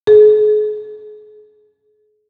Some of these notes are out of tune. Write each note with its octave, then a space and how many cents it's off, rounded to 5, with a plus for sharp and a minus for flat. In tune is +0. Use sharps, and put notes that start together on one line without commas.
G#4 +40